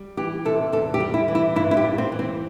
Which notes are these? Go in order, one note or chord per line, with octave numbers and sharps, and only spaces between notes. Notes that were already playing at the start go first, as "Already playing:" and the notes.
Already playing: G3
E3 G4
C3 A4
E2 A4
G4
G3
E4
E3
E4
G2 E4
E4
G4
G3
C4
E3
C4